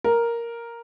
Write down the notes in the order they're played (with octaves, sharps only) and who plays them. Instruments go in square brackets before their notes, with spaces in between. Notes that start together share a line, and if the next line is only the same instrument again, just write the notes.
[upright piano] A#4